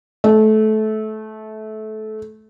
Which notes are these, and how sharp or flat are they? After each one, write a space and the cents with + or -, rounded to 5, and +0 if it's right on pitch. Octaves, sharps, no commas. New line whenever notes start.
A3 -20